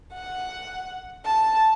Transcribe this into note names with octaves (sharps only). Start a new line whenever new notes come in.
F#5
A5